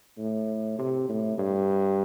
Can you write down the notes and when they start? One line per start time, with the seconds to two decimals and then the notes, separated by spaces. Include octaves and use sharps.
0.18 A2
0.79 C3
1.09 A2
1.38 G2